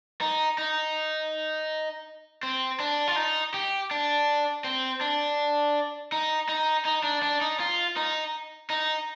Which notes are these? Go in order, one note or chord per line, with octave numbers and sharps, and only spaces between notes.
D#4
D#4
C4
D4
F4
D#4
G4
D4
C4
D4
D#4
D#4
D#4
D4
D4
D#4
F4
D#4
D#4